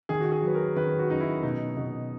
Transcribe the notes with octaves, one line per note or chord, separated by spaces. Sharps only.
D#3 G#4
F#4
G#4
F#3 B4
A#4
D#3 B4
F#4
F#2 D#4
E4
B2 D#4
B2